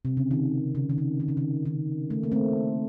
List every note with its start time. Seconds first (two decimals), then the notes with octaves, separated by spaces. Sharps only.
0.05 C3
0.17 C#3
0.31 D#3
0.75 C#3
0.89 D#3
0.98 C#3
1.20 D#3
1.28 C#3
1.37 D#3
1.65 D#3
2.10 A3
2.23 A#3
2.32 A3 C4